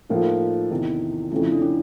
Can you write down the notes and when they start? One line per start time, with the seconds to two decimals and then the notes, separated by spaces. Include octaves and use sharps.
0.10 A2 F3 A#3 D#4
0.71 E2 C3 D#3 E4
1.31 F2 C#3 F3 A3 C#4 E4
1.42 E4
1.52 D4
1.62 C#4